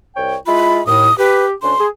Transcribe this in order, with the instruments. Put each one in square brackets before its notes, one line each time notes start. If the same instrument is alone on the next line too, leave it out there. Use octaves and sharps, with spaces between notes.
[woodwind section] C2 C#5 G5
[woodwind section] G#3 E4 F4 [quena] B5
[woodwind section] D#2 A2 [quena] D#6
[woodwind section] G4 [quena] B4
[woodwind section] D2 C#4 D4 [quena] C6
[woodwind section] G#4